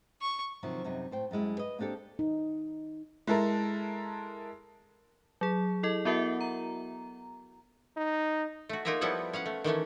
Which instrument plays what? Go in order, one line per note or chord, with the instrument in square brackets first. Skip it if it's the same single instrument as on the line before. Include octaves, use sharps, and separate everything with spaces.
[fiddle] C#6
[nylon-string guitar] C3 D#3 F3 F#3
F#2 C3 G3 D#4
A2 C5 G5
F#2 G3 G#3 E4
B4 D#5
A#3 C4 D4 G4 A4
[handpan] D#4
[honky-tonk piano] G#3 E4 A4 A#4
[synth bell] F#3 G#4
E4 A4 D#5
B3 E4 F#4 A#4 E5 F#5
A#5
[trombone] D#4
[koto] A3 F#4
A#3 D#4 F4 G#4 A#4 E5
F3 G3 B3 E4 A4 F#5
C#4 F5 F#5
A3
D#3 E3 A3 C#4